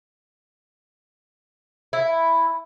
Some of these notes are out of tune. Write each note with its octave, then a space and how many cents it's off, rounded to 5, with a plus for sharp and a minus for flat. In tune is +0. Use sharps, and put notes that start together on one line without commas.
E4 +0